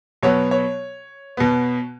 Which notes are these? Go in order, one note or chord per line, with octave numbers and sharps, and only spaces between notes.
B2 F#3 B3 C#5
C#5
B2 B3